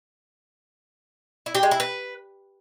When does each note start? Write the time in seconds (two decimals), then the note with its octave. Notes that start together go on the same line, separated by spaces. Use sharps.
1.46 E4
1.55 G4
1.63 G#3
1.71 E4
1.80 B4